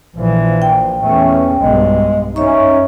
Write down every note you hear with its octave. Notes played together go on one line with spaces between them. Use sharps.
A#1 A#2 E3 F3
G5
E2 A3 C#4
B1 G2 G#3
F#2 C#4 D#4 C#5 E5 C#6